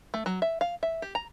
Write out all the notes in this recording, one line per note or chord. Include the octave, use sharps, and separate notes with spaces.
A3
F#3
E5
F5
E5
G4
A#5